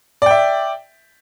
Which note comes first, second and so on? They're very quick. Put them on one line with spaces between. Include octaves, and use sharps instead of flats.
D5 G5 E5